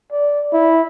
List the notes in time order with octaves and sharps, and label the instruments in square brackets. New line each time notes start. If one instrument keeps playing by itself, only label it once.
[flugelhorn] D5
E4